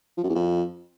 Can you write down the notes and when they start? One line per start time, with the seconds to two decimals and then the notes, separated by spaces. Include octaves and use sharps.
0.17 F3
0.23 F#2
0.29 E2
0.35 F2